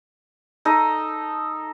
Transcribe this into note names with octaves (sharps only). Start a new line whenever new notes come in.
D#4 A4 D#5